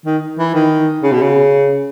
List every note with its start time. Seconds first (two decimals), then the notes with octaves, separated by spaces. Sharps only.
0.06 D#3
0.38 E3
0.55 D#3
1.03 C#3
1.12 B2
1.22 C#3